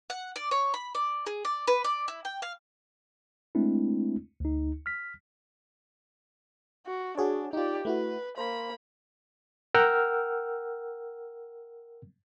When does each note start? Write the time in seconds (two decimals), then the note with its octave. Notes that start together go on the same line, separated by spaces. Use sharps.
0.10 F#5
0.36 D5
0.51 C#5
0.74 B5
0.95 D5
1.26 G#4
1.45 D5
1.67 B4
1.84 D5
2.08 E4
2.25 G5
2.42 F5
3.55 G#3 A3 C4 D4 E4
4.40 D2 D#4
4.86 F6 B6
6.87 F#4
7.17 D4 F#4 G#4 C#5
7.53 D#4 F4 G4 D5
7.85 A3 E4 F#4 B4
8.38 A#3 C5 B5
9.75 A#4 F#5 G5 E6 F6